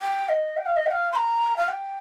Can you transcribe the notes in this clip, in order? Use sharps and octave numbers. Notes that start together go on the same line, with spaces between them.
G5
D#5
G5
F5
D#5
G5
F5
C6
A#5
F5
G5